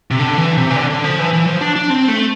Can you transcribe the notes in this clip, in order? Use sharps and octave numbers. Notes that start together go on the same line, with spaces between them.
C3
D3
E3
C3
E3
D3
D3
F3
E3
E3
F3
D4
D4
C4
A3